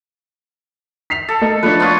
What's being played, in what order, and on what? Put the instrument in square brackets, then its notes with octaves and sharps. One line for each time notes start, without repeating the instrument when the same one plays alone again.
[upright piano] B6 C7 F7
[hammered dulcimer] A4
[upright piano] A3 A#4 D#5
[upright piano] F3 A3 D4 [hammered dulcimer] B4 C#5
[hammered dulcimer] B3 F4 C#5